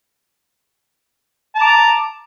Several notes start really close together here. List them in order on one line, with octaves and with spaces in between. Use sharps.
A5 A#5 D6